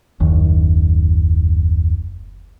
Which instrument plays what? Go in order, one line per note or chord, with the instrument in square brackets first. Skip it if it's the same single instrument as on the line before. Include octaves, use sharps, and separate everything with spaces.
[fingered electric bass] F#1 D#2